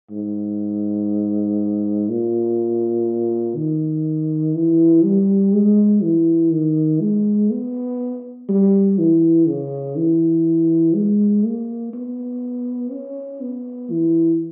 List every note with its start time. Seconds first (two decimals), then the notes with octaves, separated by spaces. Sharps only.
0.11 G#2
2.09 A#2
3.56 D#3
4.54 E3
5.04 G3
5.53 G#3
6.03 E3
6.51 D#3
7.01 G#3
7.51 B3
8.49 G3
8.98 E3
9.47 C#3
9.96 E3
10.95 G#3
11.44 A#3
11.93 B3
12.92 C#4
13.41 B3
13.90 E3